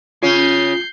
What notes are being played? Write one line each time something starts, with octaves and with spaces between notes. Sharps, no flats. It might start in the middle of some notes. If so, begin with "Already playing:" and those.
C#3 C#4 F4 G6 C7